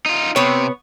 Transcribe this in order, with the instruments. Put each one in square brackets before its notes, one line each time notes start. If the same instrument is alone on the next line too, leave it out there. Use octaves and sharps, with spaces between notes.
[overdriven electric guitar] D#4 F4
[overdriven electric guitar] C3 [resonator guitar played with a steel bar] B3 C#5